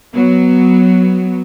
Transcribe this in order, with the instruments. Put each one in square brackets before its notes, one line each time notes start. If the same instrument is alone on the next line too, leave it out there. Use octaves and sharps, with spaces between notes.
[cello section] F#3 B3